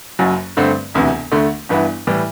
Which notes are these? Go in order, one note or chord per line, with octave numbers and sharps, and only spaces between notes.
F#1 F#2 F#3
G2 D3 A3 C4
E1 D2 C3 E3
D2 D3 A3
G1 G2 E3 B3 E4
A2 E3 G3